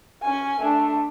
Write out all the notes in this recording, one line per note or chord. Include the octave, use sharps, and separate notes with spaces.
C#4 G#5
A3 D4